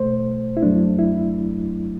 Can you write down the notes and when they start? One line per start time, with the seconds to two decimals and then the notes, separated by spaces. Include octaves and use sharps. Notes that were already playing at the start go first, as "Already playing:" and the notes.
Already playing: B2 A3 C5
0.57 E4
0.62 F#2 F#3 A3 D4
0.99 E4